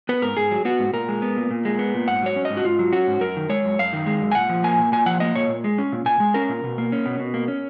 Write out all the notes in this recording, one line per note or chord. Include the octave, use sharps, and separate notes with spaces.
B3 B4
G#2 A#4
G#2 G#4
F#3
B3 F#4
G#2
A#2 A#4
G#3
B3
A#2
A#2
G#3
B3
A#2
G#2 F#5
F#3 C#5
C#4
G#2 D#5
F#4
G#2 F4
F#3
C#4 F#4
G#2
F#2 A#4
D#3
G#3 C#5
F#2
F#2 F5
D#3
G#3
F#2
G#5
A#2 F#5
F3
A#3 G#5
A#2
A#2 G#5
F3 F#5
A#3 D#5
A#2 C#5
A#2
G#3
C#4
A#2
A#2 G#5
G#3
C#4 A#4
A#2
B2
A#3
C#4
B2
B2
A#3
C#4